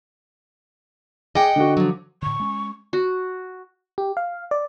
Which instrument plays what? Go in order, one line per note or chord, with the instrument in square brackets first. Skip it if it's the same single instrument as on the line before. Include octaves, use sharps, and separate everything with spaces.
[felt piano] G#4 D6 [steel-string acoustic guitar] D#5 F#5 G5
[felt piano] D3 F#4
[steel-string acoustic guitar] F3 F#3
[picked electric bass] A2 D3 [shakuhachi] C#6
[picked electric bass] G#3 C#4
[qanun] F#4
[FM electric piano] G4
F5
D5